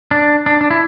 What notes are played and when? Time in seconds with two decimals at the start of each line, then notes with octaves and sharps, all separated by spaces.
0.11 D4
0.46 D4
0.61 D4
0.71 E4